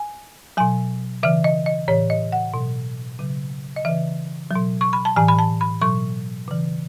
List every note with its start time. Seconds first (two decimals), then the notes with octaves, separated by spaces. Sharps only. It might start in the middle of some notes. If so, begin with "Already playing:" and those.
Already playing: G#5
0.57 B2 F#3 G#5
1.23 C#3 E3 E5
1.44 D#5
1.66 D#5
1.88 A2 E3 C#5
2.10 D#5
2.32 F#5
2.54 B2 F#3
3.19 C#3 F#3
3.76 D#5
3.85 C#3 E3 E5
4.51 B2 F#3
4.81 C#6
4.93 B5
5.05 A5
5.16 A2 E3 G#5
5.28 B5
5.39 A5
5.61 B5
5.82 B2 F#3 C#6
6.48 C#3 E3